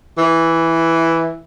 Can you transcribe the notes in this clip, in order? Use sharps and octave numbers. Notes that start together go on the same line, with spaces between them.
E3